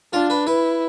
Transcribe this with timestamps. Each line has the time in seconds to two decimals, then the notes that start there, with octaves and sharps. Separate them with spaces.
0.13 D4 F4
0.30 B4
0.47 E4 B4